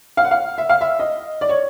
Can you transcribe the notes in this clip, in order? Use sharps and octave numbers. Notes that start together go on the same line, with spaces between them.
F5
F#5
F5
E5
F5
E5
D#5
D5
C#5